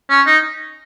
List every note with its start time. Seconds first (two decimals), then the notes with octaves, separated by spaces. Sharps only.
0.09 C#4
0.26 D#4